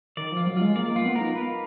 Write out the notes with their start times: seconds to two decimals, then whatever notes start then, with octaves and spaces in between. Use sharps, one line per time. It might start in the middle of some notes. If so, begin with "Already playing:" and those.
0.17 D#3 D5
0.32 F3 F4
0.47 F#3
0.57 G#3 F4
0.76 A#3 D5
0.91 A#3 F4
1.06 B3
1.16 A#4
1.21 D#4
1.35 B4